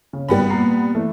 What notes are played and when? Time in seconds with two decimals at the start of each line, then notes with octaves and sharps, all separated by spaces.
0.13 C#3
0.28 G#1 G3 B3 G5 B5
0.49 A#2 A#5 C7
0.95 E3 A3